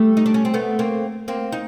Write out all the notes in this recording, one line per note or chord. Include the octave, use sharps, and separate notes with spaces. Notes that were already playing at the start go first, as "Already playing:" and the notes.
Already playing: G3 A3
D#4
D4
C#4
C4
A3 B3
A#3 C4
A#3 C4
D#4